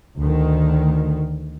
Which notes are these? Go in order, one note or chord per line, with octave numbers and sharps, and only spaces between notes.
D2 D#3